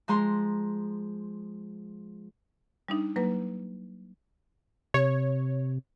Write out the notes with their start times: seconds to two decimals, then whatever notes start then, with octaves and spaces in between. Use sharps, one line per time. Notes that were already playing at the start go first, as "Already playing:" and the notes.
0.08 F3 G#3 A#5 C6
2.88 G3 D4 D#4
3.16 F#3 A#3 B4
4.94 C3 C#5